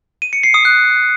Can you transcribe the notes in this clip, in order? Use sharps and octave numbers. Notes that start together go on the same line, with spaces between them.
D#7
C#7
C7
D#6
F#6